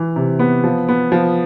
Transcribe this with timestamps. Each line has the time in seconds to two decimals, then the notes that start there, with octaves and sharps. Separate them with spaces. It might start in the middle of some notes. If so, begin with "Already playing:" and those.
Already playing: E3
0.16 C3
0.39 B3
0.64 F3
0.89 B3
1.12 F3